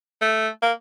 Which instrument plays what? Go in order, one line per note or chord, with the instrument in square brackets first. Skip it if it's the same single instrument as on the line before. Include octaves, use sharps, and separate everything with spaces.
[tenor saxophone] A3
A#3